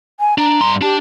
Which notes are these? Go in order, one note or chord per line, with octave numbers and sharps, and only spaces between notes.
G#5
D4 A#5
G2 C6
D4 G4 A5